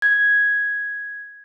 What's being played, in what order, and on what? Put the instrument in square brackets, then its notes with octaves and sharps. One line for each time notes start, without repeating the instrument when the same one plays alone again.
[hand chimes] G#6